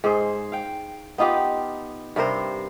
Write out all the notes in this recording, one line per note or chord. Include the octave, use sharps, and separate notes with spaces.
G#2 G#4 C5
F5 G5
B3 D#4 F4 G4
G2 C3 A#4 C5